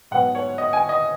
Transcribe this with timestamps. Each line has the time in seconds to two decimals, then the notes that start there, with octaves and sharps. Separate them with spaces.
0.11 G#2 F#3 B3 F#5
0.35 C#5
0.58 D#5
0.73 G#5
0.89 D#5